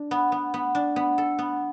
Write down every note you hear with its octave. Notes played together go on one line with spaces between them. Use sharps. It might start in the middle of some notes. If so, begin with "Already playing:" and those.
Already playing: D4
B3
B3
B3
D4
B3
A4
B3